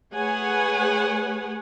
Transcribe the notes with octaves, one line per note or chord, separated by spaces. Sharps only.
A3 G#4 B4 C#5 F#5 G#5